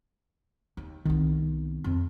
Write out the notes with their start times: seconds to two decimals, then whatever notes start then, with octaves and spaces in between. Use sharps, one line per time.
0.77 D#2
1.05 C2 D#3 B3
1.84 F2